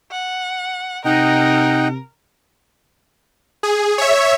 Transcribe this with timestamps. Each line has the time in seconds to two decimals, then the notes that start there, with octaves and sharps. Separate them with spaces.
0.11 F#5
1.05 C3 D#4 A#4 D#5 F#5 G5
3.63 G#4
3.98 C#5 E5